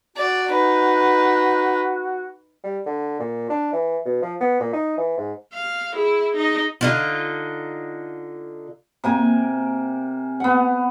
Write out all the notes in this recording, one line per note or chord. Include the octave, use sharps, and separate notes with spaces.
F#4 D5
D#4 B4
G3
D3
A#2
D4
E3
B2
F3
B3
A#2
D#4
E3
G#2
F5
E4 G#4
D#4 D#5
D3 D#4 F4
C3 A#3 G#5
B3 F#5